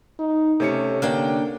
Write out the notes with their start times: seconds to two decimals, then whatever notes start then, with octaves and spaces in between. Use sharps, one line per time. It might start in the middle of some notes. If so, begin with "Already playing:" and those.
0.19 D#4
0.60 C3 A3 C#4 C#7
1.02 D3 A#3 D4 G5